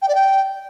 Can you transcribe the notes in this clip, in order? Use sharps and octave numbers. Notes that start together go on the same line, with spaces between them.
G5
D5
G5